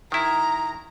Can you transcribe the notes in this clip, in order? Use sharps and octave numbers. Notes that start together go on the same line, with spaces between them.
D#3 E4 A#5